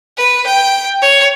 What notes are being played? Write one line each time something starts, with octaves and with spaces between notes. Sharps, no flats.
B4
G5
C#5